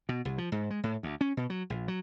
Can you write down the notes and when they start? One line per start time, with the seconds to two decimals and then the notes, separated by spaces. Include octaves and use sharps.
0.09 B2
0.25 C2
0.38 F3
0.52 G#2
0.70 G#3
0.83 A2
1.03 D2
1.21 C#4
1.37 B2
1.50 F#3
1.70 A#1
1.88 F#3